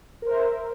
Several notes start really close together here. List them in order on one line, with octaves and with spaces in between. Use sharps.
A#4 C5 E5